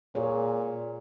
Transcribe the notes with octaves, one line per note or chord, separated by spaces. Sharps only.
A#2 G#4 C#5